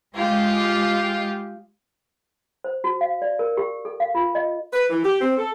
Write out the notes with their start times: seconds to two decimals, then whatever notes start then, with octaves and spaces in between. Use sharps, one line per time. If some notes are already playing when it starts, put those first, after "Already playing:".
0.16 G#3 F4 G4
2.64 C5
2.84 F#4
3.01 F5
3.22 D5
3.39 A#4
3.57 G4
3.85 A4
4.00 F5
4.15 F4
4.35 D#5
4.73 B4
4.90 E3
5.03 G4
5.21 C4
5.38 A4